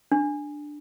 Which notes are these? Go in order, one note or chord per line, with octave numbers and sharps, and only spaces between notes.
D4